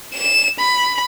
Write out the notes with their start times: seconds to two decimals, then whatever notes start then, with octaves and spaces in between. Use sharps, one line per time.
0.14 E7
0.59 B5